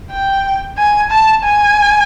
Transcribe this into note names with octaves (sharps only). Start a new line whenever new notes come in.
G5
G#5
A5
G#5